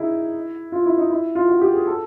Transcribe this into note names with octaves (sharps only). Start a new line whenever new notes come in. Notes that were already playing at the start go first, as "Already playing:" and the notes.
Already playing: D#4 E4 G#4
F4
E4
D#4
E4
F4
F#4
G4
G#4
A4